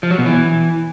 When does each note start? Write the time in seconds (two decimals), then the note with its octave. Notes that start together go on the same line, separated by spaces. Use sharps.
0.03 F3
0.11 F#3
0.18 B2
0.26 E3